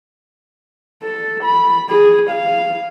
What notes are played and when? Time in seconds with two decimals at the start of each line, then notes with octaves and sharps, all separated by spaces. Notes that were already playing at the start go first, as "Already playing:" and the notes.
1.03 A4
1.44 B5
1.89 G#4
2.30 F5